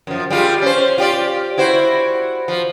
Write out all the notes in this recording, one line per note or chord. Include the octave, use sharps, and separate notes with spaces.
F#2 F3
G3 G#3 F4
C#4 C5
F4 G4 D5
E4 F#4 C5
F3